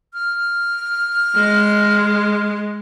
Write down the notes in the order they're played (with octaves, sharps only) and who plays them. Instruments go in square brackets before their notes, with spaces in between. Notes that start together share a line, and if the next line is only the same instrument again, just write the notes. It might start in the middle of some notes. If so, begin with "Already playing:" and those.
[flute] F6
[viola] G#3